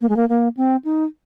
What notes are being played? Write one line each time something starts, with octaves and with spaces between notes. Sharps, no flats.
A#3
G#3
A#3
A#3
C4
D#4